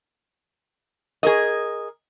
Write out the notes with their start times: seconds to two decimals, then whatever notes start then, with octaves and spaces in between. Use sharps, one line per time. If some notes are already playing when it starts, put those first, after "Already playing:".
1.23 G#4 A#4 D#5